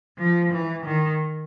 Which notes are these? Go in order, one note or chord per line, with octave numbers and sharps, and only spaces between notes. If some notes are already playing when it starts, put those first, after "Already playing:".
F3
E3
D#3